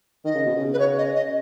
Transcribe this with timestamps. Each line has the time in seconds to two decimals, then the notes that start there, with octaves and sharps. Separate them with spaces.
0.24 D#3 D#5
0.35 C#3
0.45 B2
0.56 C#3
0.73 B4
0.79 C#5
0.98 D#5
1.16 D#5